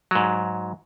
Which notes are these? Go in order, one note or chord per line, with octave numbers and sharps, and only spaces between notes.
G#2 F#3